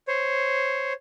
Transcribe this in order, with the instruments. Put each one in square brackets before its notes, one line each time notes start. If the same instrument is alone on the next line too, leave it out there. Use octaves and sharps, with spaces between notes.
[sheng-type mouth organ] C5 C#5